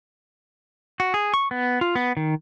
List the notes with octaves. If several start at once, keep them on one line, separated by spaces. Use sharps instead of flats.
F#4
G#4
C#6
B3
F4
B3
D#3